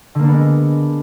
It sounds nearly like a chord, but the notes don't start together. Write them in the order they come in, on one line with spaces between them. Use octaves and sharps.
D3 A#3 D4 B3 G#3